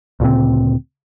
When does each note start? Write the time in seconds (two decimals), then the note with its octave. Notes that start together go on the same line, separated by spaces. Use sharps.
0.20 D2 A#2 C#3 C4